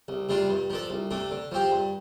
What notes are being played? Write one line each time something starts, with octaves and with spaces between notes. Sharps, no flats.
C2
C3 G3 D4 F4
G2
F3 D4 A4
C2
C3 A3 D4
D3
F3 C4 G4
G2